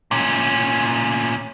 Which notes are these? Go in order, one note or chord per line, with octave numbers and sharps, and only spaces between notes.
A#2 C#4